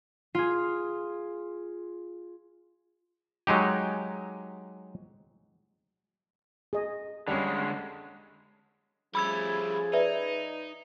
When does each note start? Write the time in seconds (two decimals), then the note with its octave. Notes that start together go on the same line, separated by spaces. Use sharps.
0.35 F4 G#4
3.47 F#3 G#3 D#4 G4
6.73 G#4 D#5
7.28 D3 G3 G#3 C#4
9.15 F3 G3 A3 C#4 G#4 B5 E6 G#6
9.93 D#4 B4 D5 E5